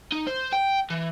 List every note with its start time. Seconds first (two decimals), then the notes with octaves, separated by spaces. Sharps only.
0.12 D#4
0.27 C5
0.52 G5
0.90 E3